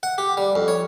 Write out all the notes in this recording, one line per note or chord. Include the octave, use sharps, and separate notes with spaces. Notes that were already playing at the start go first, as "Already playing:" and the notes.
F#5
G4
G3
F2
C#5